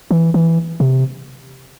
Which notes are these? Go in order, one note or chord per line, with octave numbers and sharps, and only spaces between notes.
E3
E3
C3